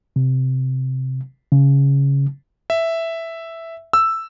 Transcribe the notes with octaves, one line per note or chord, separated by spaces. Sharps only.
C3
C#3
E5
E6